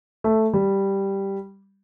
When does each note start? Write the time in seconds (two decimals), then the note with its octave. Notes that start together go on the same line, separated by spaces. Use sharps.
0.24 A3
0.53 G3